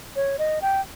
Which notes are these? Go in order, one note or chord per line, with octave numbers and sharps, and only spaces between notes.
C#5
D#5
G5